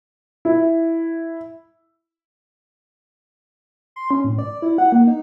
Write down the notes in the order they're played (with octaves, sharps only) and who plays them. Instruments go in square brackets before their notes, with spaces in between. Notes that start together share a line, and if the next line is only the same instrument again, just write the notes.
[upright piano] E4
[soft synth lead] C6
C#4
A2
D5
E4
F#5
A#3
D#4